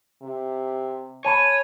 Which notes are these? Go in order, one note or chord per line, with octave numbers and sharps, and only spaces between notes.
C3
C#5 G#5 A5 B5 D#7